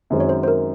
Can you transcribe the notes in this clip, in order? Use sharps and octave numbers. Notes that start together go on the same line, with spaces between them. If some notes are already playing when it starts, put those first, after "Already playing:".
F#2 D#3 G#3 C4 F#4
C#5
C5
C5
A#4